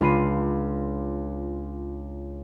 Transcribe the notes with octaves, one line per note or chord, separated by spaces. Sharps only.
C#2 D4 F4 B5 C7 D#7